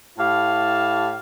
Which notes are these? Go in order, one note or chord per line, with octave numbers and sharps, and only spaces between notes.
A2 E4 G4 F5 A5